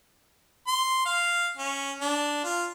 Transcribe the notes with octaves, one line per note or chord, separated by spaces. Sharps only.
C6
F5
C#4
D4
F4